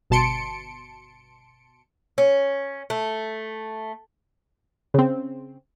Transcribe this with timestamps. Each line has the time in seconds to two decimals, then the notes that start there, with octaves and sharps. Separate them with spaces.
0.10 G1 B2 A5 C6 C#7 D7
2.18 C#4
2.90 A3
4.94 C#3 C4